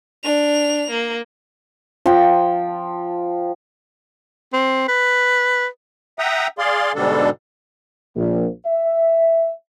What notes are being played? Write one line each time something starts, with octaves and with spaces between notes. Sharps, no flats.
D4 F7
A#3
F3 G5
C4
B4
E5 F#5 G5 A#5 D#6
G#4 D5 F5 C6
G#2 B2 D3 G3 D4 A4
A#1
E5